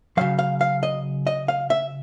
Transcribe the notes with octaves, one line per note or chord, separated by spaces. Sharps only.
C#3 F#3 F5
F5
F5
D#5
D#5
F5
E5